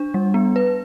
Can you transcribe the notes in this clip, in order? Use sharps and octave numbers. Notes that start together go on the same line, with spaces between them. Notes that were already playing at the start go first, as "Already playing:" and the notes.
Already playing: D4
G3
B3
B4